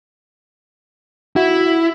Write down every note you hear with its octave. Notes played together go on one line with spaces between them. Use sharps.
E4 F#4